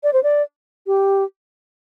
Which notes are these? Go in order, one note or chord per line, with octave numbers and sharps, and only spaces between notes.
D5
C5
D5
G4